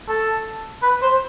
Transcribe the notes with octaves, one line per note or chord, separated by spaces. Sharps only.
A4
B4
C5